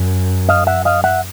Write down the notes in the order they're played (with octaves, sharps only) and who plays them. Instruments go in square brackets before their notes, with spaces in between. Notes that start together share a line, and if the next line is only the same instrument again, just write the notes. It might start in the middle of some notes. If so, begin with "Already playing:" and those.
Already playing: [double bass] F#2
[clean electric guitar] D#5 F5
E5 F#5
D#5 F5
E5 F#5